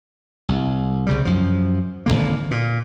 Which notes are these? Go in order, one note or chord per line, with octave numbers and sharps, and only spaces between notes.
C2
C2 C#3 G3
F#2 F3
G#1 F#2 D3 A#3
A#2